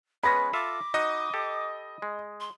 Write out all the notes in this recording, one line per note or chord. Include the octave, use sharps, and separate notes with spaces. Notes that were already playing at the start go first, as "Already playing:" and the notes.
G#3 B3 C#4 B4 B5 A#6
F4 A4 E5 D6
D#4 F#4 D#5 D#6
G4 A4
G#3
C6